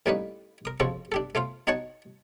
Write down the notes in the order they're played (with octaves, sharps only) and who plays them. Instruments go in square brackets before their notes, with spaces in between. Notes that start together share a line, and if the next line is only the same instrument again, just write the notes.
[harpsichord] A2 G3 A#3 C#4 D#4 B4
A#4 D#6
F2 C#3 F3 F#4 A4 C#6
D4 G4 A4
A3 F4 C5 F5
D#4 F#4 C#5 F#5 A5 C#6